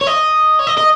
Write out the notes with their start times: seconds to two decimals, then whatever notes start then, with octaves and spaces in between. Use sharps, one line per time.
0.01 C#5
0.07 D#5
0.59 C#5
0.67 D#5
0.78 D#5